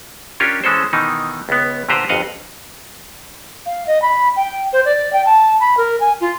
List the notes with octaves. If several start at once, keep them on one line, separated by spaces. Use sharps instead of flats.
C#4 D4 F4 G4 A#4 C#5
E3 G#3 C#4 A4 C5
B2 D#3 E3 D#4
C#2 B3
A#2 D3 G4 B4 C5 A#5
G1 F2 D#5 F5 F#5
F5
D#5
B5
G5
C5
D5
G5
A5
B5
A#4
G#5
F4